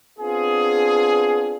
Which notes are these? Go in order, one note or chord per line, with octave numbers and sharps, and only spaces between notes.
B3 C4 D4 F4 G#4